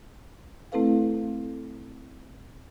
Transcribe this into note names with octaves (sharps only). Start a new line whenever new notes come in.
A3 C4 E4 A4 B4 F5